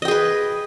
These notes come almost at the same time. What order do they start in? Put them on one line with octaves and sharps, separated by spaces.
D#5 G5 G#4 B4